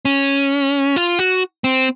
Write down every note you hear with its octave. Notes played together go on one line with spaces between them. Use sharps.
C#4
F4
F#4
C4